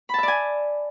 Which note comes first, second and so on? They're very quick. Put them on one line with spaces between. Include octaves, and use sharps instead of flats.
B5 A5 E5 D5 G#5